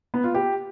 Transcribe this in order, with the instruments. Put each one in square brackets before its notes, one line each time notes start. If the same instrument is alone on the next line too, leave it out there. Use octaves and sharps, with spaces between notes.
[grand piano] B3
F4
G4